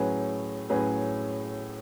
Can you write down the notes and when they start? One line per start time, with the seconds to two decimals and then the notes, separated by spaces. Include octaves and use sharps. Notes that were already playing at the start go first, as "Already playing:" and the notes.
Already playing: A2 F#3 C#4 G#4 B4
0.69 A2 F#3 C#4 G#4 B4